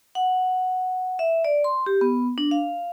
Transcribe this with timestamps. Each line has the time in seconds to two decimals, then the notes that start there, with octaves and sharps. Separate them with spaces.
0.15 F#5
1.19 E5
1.45 D5
1.64 C6
1.86 G4
2.01 B3
2.38 D4
2.51 F5